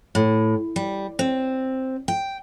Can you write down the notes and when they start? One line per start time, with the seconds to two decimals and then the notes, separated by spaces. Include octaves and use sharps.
0.15 A2
0.76 G3
1.19 C4
2.08 G5